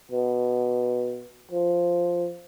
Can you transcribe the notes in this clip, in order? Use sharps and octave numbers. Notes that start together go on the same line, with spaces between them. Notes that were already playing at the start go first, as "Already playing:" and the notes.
B2
F3